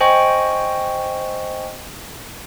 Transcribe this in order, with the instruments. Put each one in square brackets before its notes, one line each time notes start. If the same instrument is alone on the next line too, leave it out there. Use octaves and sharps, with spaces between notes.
[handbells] C5 D#5 G5 G#5 C#6